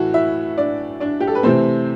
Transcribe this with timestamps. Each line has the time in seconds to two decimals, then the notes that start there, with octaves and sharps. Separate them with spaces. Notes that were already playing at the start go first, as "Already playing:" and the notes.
Already playing: A2 E3 A3 F#4
0.14 E4 E5
0.57 D4 D5
1.00 D4 D5
1.20 G4
1.27 A4
1.35 B4
1.43 C3 E3 A3 C4 C5